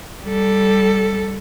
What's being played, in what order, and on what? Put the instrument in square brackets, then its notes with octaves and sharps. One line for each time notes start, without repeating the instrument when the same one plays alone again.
[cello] G3 A4